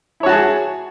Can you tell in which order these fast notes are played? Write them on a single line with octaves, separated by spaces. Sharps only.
E4 C#5 F#4 A5 G#4